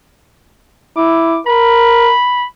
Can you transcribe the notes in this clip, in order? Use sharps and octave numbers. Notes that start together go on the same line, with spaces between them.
E4 D6
A#4 B5